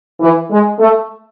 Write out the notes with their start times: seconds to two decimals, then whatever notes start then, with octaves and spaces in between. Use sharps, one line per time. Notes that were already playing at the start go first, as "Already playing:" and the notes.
0.20 E3
0.51 G#3
0.79 A3